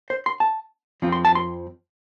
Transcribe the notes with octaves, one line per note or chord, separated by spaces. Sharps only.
C5
C6
A5
F2 F3 C4 F4
C6
A5
C6